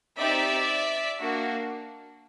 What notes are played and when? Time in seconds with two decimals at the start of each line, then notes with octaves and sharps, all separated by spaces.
0.18 C4 D#4 G4 D5 E5
1.18 A#3 D4 F#4